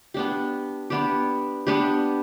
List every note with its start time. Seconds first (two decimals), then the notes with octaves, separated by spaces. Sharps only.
0.14 B3 D4 G4
0.90 B3 D4 G4
1.67 B3 D4 G4